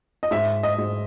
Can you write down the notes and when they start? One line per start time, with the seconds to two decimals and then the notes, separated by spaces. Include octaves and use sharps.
0.23 D#5
0.31 G#2 E5
0.63 D#5
0.78 G#2